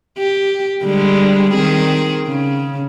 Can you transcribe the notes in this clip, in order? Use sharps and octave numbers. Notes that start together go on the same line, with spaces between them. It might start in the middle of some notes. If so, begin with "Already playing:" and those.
G4
D3 G3 G#3
D#3 C4 G#4
C#3